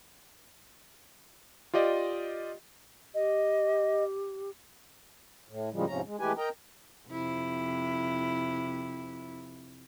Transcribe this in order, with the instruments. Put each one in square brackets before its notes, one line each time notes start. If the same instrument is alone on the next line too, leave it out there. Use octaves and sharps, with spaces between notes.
[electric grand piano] F4 G4 D5 D#5
[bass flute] G4 [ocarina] D#5
[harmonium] A2
A2 C#3 F3 G3 G#3
E2 G#2 C3 F3 C#4 A#5
G#3
E3 G#3 A3 G4 B4 G#5
A#4 D#5 G5 A#5
[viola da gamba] F2 C3 E4